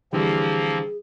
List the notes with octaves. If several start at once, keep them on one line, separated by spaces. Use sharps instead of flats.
D3 E3 F3 G3 A#3 C4 G#4